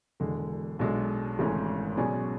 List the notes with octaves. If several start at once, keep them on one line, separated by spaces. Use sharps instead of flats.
E1 E2 D3 G#3
B1 B2 G#3 D4 A4
G#1 G#2 E3 A3 C#4
B2 F#3 C#4 G#4 D5